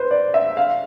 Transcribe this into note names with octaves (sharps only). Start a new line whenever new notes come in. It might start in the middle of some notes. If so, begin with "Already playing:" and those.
Already playing: B4 C5
D5
E5
F5